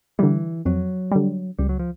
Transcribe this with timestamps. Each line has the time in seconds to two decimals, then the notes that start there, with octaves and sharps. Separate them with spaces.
0.19 D3 E3 G3
0.65 F2 F#3
1.11 D3 G3
1.59 C#2 G3
1.69 F#3
1.79 F3